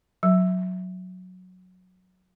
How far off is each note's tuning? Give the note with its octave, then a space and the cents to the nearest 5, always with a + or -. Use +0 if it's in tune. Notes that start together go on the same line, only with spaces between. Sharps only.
F#3 -10